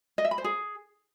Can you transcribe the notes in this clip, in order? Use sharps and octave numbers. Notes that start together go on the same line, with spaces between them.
D#5
E5
B5
C5
G#4